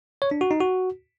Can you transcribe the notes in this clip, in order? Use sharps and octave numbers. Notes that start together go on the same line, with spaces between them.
C#5
D4
F#4
D#4
F#4